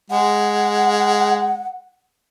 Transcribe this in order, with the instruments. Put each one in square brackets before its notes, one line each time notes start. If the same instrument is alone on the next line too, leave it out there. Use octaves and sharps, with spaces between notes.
[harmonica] G#3 [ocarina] F#5